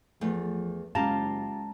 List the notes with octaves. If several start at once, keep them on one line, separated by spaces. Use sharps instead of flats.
E2 F3 A3
F#1 G#3 C#4 F4 G4 F5 A5 A#5